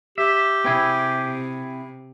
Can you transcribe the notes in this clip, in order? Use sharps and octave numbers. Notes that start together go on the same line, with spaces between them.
G4 E5
C3 C4 E4 G#4